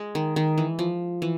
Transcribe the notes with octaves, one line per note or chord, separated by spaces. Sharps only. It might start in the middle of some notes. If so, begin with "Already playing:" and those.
Already playing: G#3
D#3
D#3
E3
F3
E3